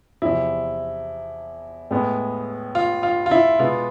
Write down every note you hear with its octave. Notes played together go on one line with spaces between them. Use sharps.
E2 C3 F3 E4
A2 G#3 B3
F4
F4
F4
E4
B2 G#3 B3 F4